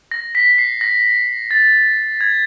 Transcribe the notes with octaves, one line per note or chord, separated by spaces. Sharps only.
A#6
B6
C7
A#6
A6
G#6